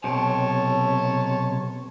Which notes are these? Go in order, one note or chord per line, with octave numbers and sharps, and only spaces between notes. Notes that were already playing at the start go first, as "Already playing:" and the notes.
B1 C3 C#5 A5